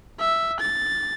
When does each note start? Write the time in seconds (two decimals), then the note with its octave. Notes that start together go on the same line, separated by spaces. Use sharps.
0.20 E5
0.60 A6